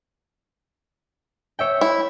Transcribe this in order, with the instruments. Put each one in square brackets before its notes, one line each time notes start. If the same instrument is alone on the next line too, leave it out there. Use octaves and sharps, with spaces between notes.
[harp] C#5 E5 G5
[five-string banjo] E4